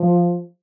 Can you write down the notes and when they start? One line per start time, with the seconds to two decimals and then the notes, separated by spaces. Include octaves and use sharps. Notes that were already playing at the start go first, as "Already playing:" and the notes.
Already playing: F3